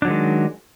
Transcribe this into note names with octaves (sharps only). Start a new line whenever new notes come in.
D#3 F#3 G#3 D4